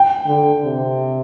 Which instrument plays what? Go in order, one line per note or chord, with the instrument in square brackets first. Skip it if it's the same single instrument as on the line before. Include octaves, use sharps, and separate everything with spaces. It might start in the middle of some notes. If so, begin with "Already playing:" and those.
Already playing: [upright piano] G5
[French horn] D3
C3